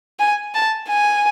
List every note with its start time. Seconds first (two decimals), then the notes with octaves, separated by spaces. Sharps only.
0.19 G#5
0.54 A5
0.88 G#5